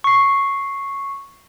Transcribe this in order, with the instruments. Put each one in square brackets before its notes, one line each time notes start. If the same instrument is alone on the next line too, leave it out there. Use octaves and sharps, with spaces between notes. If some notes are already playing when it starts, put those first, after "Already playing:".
[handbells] C#6 C7